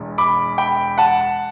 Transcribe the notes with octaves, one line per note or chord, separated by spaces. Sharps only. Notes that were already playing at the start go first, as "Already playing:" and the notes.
Already playing: E1 E2
B5 D6
G5 B5
F#5 A5